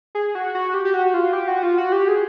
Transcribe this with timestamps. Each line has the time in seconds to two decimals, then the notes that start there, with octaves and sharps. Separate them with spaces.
0.15 G#4
0.35 F#4
0.55 F#4
0.74 G4
0.85 G4
0.94 F#4
1.14 F4
1.33 G4
1.48 F#4
1.63 F4
1.78 F#4
1.92 G4
2.08 G#4